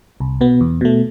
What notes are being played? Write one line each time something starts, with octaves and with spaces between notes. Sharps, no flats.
C2
B2 B3
E2
B2 A3